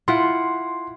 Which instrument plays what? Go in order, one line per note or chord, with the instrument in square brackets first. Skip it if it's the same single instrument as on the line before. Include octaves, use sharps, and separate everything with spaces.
[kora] E4 F4 F#5 [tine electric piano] C6